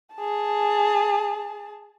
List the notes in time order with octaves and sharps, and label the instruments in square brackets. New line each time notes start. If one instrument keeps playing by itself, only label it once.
[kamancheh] G#4 A5